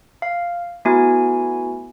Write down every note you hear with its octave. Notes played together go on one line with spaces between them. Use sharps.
F5
A3 B3 E4 F#4 G#5